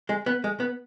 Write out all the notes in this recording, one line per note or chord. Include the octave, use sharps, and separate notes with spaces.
G#3
B3
G#3
B3